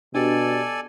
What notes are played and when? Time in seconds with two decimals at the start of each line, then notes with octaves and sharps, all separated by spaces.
0.15 B2 D4 G4 A4 D5 G#5